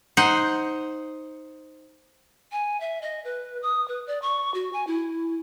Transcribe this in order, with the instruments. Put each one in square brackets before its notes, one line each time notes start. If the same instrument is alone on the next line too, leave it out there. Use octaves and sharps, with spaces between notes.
[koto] D#4 C5 F#5
[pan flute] G#5
E5
D#5
B4
D#6
B4
D5
C#6
F#4
G#5
E4